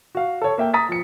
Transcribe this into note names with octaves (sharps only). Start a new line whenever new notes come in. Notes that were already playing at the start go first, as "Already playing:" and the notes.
F#4 F5
A4 C#5
A#3 E5 G5
A#5 D#6 A6 B6
F3 C#7